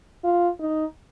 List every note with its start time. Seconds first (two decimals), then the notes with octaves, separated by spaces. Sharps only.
0.24 F4
0.60 D#4